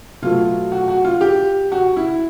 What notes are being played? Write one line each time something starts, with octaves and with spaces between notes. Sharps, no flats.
B2 F#3 A3 F4
F#4
F#4
F4
G4
F#4
E4